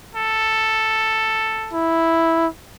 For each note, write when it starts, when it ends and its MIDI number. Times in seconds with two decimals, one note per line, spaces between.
0.15 1.76 69
1.73 2.47 64